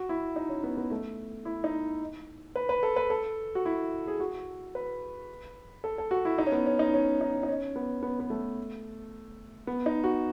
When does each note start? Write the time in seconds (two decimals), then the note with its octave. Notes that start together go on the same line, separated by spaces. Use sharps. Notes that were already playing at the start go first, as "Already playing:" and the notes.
Already playing: F#4
0.09 E4
0.36 D#4
0.49 C#4
0.64 B3
0.77 B3
0.91 A3
1.45 E4
1.64 D#4
2.55 B4
2.69 B4
2.83 A4
2.96 B4
3.10 A4
3.55 F#4
3.65 E4
4.07 G#4
4.20 F#4
4.75 B4
5.84 A4
5.98 A4
6.11 F#4
6.25 E4
6.38 D#4
6.46 C#4
6.52 B3
6.66 C#4
6.79 D#4
6.94 C#4
7.21 D#4
7.43 D#4
7.48 C#4
7.76 B3
8.03 B3
8.20 B3
8.30 A3
9.67 B3
9.86 D#4
10.04 F#4